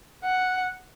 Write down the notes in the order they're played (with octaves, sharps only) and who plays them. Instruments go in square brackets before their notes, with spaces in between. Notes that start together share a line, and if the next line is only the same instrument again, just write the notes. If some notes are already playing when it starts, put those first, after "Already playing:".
[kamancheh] F#5